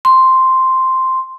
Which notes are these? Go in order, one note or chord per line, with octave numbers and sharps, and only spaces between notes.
C6